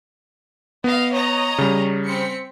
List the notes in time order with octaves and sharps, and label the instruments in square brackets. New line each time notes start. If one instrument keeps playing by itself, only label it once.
[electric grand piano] B3 [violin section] D#5 F5
[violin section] C#5 D#5 A#5
[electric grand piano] C#3 G3
[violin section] C4 B6 C#7